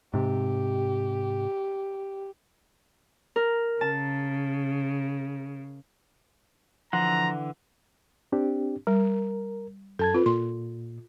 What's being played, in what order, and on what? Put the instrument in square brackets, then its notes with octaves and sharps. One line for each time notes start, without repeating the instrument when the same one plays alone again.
[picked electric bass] G#2 C3 [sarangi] G4
[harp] A#4
[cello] C#3 [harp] A5
[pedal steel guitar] D3 E3 F#5 [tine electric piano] F3 C6 [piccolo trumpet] A#5
[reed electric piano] C4 D4 G4
[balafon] G3 [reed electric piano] A#4
[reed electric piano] F#2 A5 G#6 [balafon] A4
[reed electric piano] C4 B4 [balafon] F4
[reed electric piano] A#2 [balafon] C6